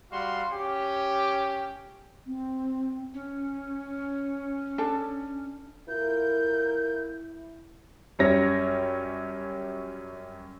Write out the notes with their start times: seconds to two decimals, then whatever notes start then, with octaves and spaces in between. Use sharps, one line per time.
0.12 G3 F#4 F5 F#5 C6
0.52 C#4 G4
2.26 C4
3.14 C#4
4.78 D4 A4 A5
5.89 A2 E4 F4 A#4 G6
8.19 F#2 G3 C#4 C#5 A#6